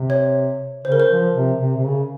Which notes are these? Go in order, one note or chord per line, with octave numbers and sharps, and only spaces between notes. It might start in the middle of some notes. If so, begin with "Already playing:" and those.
Already playing: C3
C#5
C#3 C5
A#4
C5
F3
C3
C3
C3
C#3